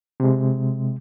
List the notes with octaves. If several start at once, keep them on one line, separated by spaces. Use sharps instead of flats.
C3 G#3